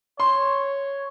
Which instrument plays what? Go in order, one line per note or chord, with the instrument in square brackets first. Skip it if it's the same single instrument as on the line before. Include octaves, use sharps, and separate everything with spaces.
[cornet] C#5 [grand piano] C6